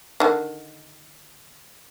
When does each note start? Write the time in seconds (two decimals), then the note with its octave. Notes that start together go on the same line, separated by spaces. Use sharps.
0.20 D3 D#3